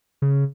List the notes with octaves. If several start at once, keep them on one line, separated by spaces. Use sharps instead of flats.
C#3